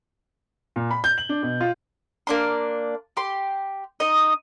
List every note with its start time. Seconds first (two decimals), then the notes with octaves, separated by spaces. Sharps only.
0.76 A#2
0.91 B5
1.04 G6
1.18 F#7
1.29 D4
1.43 B2
1.61 F4
2.27 A#3 D4 C6
3.17 G4 C6
4.00 D#4 D#5